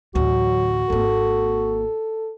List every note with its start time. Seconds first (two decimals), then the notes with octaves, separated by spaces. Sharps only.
0.15 A1 D2 F#3 F#4
0.90 G#1 A#3 A4